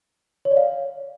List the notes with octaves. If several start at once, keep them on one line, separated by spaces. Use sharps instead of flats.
C#5
D5
F5